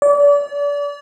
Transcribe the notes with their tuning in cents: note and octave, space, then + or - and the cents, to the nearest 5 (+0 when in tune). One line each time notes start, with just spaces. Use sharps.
D5 -35